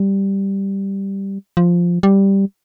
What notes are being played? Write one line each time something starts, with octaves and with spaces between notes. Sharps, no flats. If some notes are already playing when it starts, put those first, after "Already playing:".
Already playing: G3
F3
G3